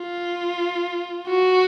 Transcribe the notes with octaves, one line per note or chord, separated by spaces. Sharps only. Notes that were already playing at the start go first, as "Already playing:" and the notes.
Already playing: F4
F#4